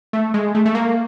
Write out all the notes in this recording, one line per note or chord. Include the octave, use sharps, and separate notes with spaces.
A3
G#3
A3
A3
A#3